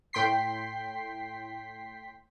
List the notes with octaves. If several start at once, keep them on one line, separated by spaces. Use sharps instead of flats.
A2 G5 C6 B6 C7